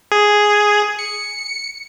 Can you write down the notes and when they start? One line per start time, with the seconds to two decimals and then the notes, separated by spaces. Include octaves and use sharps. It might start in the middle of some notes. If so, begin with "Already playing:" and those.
0.12 G#4
0.99 C#7